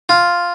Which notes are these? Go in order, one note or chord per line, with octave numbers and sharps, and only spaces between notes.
F4